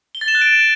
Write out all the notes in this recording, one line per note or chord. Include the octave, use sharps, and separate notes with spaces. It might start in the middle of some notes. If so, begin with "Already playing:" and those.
G7
A6
E7
F#6
D7